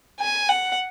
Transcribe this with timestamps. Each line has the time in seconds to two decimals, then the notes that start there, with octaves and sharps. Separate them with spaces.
0.20 G#5
0.49 F#5